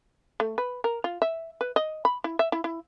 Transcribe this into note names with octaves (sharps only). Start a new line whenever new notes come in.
A3
B4
A#4
F4
E5
B4
D#5
B5
E4
E5
E4
E4